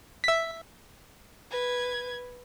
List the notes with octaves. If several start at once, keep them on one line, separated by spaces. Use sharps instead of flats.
E5 B6
B4 G#6